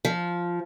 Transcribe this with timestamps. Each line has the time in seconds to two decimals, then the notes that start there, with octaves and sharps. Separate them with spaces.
0.05 F3